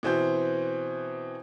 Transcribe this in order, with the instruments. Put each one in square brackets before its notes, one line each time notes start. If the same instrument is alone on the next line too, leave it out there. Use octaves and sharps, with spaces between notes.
[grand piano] B2 E3 C4 G6